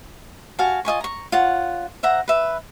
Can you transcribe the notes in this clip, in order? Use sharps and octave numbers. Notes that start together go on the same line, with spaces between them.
F#4 F5 G#5 A5
F4 D#5 G#5 C#6
A#5 C#6
F4 C#5 F#5
C5 E5 F#5 A#5
B4 E5